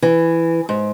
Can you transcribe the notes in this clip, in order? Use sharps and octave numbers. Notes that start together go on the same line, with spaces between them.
E3
G#2